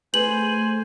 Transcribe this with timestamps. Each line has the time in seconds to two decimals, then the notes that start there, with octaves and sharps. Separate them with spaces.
0.14 A3 G#4 B4 C5 G#5 F#7